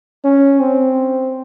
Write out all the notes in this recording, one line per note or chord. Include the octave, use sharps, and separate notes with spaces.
C#4
C4